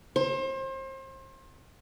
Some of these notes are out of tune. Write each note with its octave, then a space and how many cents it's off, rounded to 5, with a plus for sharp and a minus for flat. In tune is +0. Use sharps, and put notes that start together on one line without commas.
C5 +35